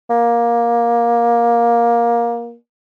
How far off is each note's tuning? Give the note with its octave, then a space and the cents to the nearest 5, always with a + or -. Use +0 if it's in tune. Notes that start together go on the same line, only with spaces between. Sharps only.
A#3 +15